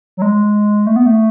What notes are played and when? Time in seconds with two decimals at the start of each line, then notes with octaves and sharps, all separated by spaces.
0.17 F#3
0.22 G#3
0.87 A3
0.96 B3
1.06 A3